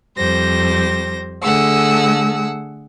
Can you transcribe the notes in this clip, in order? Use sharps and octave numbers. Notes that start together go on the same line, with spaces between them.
F2 G3 C5 A#6
D3 A3 G#4 F#5 E6